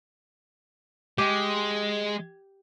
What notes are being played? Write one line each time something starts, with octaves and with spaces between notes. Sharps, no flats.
G#3 G4